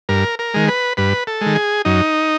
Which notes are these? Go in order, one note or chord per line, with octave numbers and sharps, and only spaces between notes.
G2 A#4
A#4
D#3 G#3
B4
G2 B4
A4
G#3
D#3
G#4
F#2 D#4